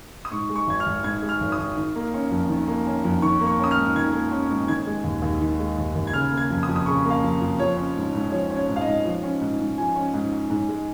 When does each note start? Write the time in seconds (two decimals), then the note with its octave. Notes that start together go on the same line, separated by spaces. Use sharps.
0.25 D#6
0.31 G#2 C#6
0.49 G#3
0.56 C#6
0.67 G#1 G#6
0.80 F6
0.86 G#1
1.04 G#2 G#6
1.22 G#3
1.29 F6
1.41 G#1
1.52 D#6
1.58 G#1
1.77 D#3
1.96 A#3
2.14 C#4
2.31 F2
2.49 D#3
2.68 A#3
2.86 C#4
3.04 F2
3.22 D#3 C#6
3.40 A#3
3.47 C#6
3.60 C#4 D#6
3.71 F6
3.77 G#2
3.96 D#3 G#6
4.13 A#3
4.32 C#4
4.50 G#2
4.68 D#3 G#6
4.87 G#3
5.04 D#2
5.22 D#2
5.41 D#3
5.59 G#3
5.77 D#2
5.95 D#2
6.07 G#6
6.13 C#3 F6
6.31 A#3
6.37 G#6
6.50 F2
6.63 D#6
6.68 F2
6.76 D#6
6.86 C#3 C#6
7.05 A#3
7.10 F5
7.23 F2
7.41 F2
7.59 F3 C#5
7.77 C#4
7.96 G#2
8.15 G#2
8.32 F3 C#5
8.51 C#4
8.57 C#5
8.69 G#2
8.76 F5
8.81 D#5
8.87 G#2
9.05 F3
9.23 C#4
9.41 G#2
9.60 G#2
9.78 F3 G#5
9.96 C#4
10.14 G#2
10.33 G#2
10.50 G#2
10.68 G#3